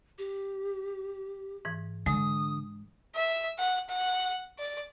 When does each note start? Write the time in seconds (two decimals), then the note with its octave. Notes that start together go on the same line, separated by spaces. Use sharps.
0.18 G4
1.65 G#2 E3
2.06 D3 G#3 D#6
3.15 E5
3.58 F#5
3.89 F#5
4.59 D5